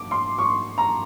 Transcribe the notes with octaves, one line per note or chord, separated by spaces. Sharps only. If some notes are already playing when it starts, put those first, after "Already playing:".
Already playing: D6
C6
C#6
A#5